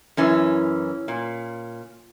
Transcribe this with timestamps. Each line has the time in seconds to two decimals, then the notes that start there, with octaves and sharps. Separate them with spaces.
0.17 F#2 E3 C#4
1.08 A#2